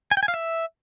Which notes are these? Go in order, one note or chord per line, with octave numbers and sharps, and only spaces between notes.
G#5
G5
G#5
F5
E5